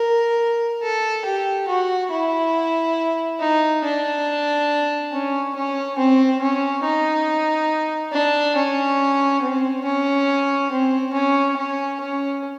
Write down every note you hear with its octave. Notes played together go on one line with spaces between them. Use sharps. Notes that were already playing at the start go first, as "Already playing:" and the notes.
Already playing: A#4
A4
G4
F#4
E4
D#4
D4
C#4
C#4
C4
C#4
D#4
D4
C#4
C4
C#4
C4
C#4
C#4
C#4